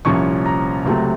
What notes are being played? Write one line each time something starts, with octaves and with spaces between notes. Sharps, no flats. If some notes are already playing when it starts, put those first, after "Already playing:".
C2 A#2 F3 A#3 C#4 C#6
A#5
C#2 C3 F#3 A3